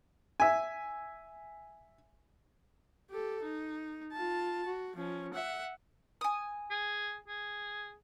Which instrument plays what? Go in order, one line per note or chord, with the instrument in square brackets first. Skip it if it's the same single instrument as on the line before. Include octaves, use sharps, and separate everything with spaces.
[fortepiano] E5 G#5
[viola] G4 A4
D#4
F4 A5
F#4
F3 C#4
E5 F#5
[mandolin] G#5 D#6
[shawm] G#4
G#4